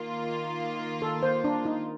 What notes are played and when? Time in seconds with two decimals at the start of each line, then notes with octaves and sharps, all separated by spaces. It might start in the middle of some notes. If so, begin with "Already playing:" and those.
Already playing: D#3 A#3 F4
1.02 A4
1.23 C5
1.44 D4
1.65 D#4